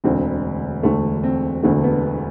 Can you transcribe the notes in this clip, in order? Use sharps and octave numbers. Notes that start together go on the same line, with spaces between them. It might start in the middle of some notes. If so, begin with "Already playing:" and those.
E1 D2 D3 C4
E1 D2 D3 A3
C4
E1 D2 D3 A3
B3